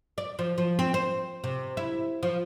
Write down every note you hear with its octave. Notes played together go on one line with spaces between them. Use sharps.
D5
F3
F3
C4
C5
C3
E4
F3